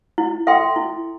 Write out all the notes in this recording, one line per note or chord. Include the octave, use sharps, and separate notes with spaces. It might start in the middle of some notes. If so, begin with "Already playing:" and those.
E4
A4 E5 G5 C6
E4